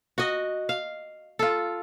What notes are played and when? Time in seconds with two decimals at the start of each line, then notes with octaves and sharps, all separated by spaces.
0.18 F#4 D#5
0.69 F5
1.39 F4 A4